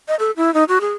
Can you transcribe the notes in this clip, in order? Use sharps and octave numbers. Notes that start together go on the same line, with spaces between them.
D#5
A4
E4
D#4
F#4
G#4